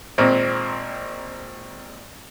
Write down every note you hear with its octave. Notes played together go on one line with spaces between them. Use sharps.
G#1 A#2 C4